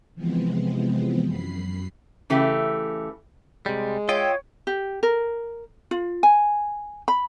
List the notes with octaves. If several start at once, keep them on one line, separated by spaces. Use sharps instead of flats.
C3 E3 F3 G#3 B3 C4
F#2 B5 C7
C#3 E3 A3 G4
C3 G3 G#3
F4 C#5 D#5 E5 G5 C6
G4
A#4
F4
G#5
B5